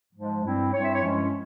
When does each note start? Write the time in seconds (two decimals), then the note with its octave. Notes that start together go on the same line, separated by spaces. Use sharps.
0.14 G#2 F3 G#3
0.43 G2 G3 C4 E4
0.73 G2 G3 C4 E4 C#5
0.84 E5
0.95 C#5
1.03 G2 F3 G#3 C#4 E4